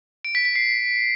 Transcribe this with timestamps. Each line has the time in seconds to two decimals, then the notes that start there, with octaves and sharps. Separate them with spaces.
0.25 D7
0.35 B6
0.45 B6
0.56 C7